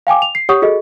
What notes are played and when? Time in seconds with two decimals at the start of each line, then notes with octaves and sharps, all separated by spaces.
0.07 F5 G5 G#5 D6
0.22 F7
0.35 C7
0.49 G4 C#5 F#5 C#6 D#6
0.62 F#4 G#4 A4 D#5